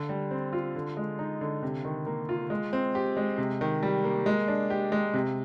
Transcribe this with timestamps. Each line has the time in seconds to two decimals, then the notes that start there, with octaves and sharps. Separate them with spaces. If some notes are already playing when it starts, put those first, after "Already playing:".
Already playing: D3
0.09 G3
0.31 C4
0.53 F4
0.75 D3
0.97 G#3
1.19 D#4
1.41 D3
1.62 C3
1.84 D#3
2.07 A#3
2.29 F4
2.50 G#3
2.73 C4
2.95 G4
3.17 G#3
3.38 C3
3.61 D#3
3.83 G3
4.04 A#3
4.26 G#3
4.48 D4
4.70 G4
4.92 G#3
5.14 C3